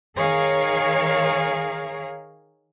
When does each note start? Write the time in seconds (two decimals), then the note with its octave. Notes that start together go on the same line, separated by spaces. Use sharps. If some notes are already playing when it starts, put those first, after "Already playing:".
0.17 D#3 G#4 A#4 C#5 F5